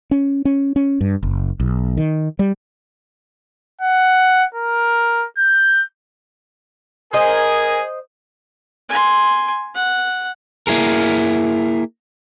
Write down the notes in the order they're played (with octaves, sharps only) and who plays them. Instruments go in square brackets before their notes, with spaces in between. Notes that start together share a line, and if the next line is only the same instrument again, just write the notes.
[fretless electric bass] C#4
C#4
C#4
G2
F#1
B1
D#3
G3
[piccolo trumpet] F#5
A#4
G6
[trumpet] G#4 [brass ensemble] A#4 G#5 [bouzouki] C5 D#5
[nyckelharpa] G#5 C6
F#5
[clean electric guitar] A#3 E4 G#4 A#4